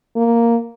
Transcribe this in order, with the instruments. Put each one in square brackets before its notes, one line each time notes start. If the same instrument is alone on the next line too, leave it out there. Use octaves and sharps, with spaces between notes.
[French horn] A#3